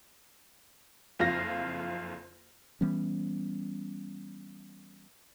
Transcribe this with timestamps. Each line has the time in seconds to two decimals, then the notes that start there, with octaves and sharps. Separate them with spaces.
1.19 F#1 F2 F4 F5 A#6
2.81 E3 G3 B3 C#4